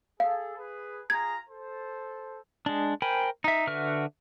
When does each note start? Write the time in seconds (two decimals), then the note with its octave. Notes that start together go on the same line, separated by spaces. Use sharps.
0.20 G#4 A4 F5
0.57 G#4 B4
1.10 F4 G#4 A#5 G#6
1.49 A4 C5
2.66 G#3 D4
3.02 A#4 C5 G5 G#5 B5
3.44 D#4 E5
3.67 D3 F#4 B4 E5 F6